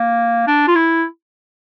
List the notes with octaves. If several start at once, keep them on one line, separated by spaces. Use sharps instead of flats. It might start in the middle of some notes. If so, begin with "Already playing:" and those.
Already playing: A#3
D4
F4
E4